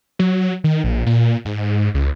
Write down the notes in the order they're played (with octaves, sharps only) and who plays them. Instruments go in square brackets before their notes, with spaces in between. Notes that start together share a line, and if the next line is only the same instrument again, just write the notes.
[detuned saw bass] F#3
D#3
A#1
A#2
G#2
C#2